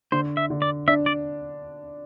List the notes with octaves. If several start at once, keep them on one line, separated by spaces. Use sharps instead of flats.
D3 C5
E5
D3
D5
D4 E5
D5